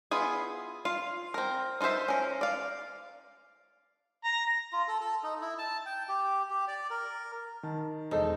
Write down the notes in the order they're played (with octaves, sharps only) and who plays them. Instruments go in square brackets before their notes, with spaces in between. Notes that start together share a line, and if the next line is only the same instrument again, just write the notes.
[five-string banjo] B3 E4 F4 G#4
F4 F5
C4 A#4
D#4 F4 A4 C5 E5
C#4 A#4
D5 F5
[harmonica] A#5
[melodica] F4
A4
A4
D#4
E4
A5
G5
G4
G4
D5
A#4
[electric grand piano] D#3 A5
[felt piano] E1 A4 C5 [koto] D#4